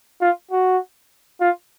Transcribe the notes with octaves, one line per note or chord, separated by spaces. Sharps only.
F4
F#4
F4